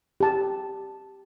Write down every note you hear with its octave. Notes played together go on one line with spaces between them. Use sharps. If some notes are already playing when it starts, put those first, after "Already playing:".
G4 A5